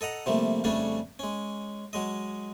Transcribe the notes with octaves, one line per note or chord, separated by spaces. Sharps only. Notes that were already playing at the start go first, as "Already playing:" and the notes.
A4 D#5 F#5 A#5
C3 F3 G3 A3 A#3
F2 C#3 G3 A3 C#4 D4
G#3 C#4
F#3 G#3 D#5